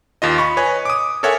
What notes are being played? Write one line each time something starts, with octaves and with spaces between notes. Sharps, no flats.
D#2 F4 D#5
B5 C#6
B4 C#5 D#5 G#5
D6 D#6
A4 A#4 C#5 E5 F#5 G#5